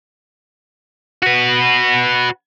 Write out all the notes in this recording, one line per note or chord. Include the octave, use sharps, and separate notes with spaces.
F#4 B4